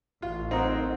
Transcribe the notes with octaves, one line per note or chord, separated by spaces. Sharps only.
A1 F4
C4 D#4 A#4 D#5 F#5